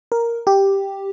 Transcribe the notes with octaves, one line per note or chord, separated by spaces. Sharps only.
A#4
G4